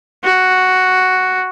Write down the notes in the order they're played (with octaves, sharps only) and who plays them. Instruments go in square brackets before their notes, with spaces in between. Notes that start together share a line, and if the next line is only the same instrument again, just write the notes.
[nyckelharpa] F#4